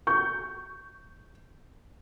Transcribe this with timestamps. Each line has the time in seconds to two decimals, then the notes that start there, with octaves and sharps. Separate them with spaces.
0.07 C#6 G6